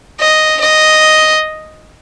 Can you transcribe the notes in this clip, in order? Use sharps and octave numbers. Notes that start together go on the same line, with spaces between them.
D#5
D#5